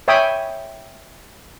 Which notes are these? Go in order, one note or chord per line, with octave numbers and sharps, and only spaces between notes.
C#5 E5 G5 G#5 B5 D#6